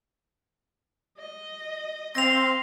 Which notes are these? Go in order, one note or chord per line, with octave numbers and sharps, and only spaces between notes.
D#5
C4 F5 C6 A#6 F7